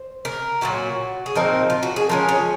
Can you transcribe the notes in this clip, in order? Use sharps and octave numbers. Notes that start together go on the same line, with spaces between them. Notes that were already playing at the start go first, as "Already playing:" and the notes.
Already playing: C5
A#4
A#2 F#3 C#4 F#4
G#4
A#2 F3 C4 D#4 A#4
F4
F#4
G#4
F3 G#3 C#4 A#4
C#5